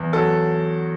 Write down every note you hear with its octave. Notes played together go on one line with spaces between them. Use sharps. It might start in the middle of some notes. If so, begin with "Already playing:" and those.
Already playing: E2
F#3 A4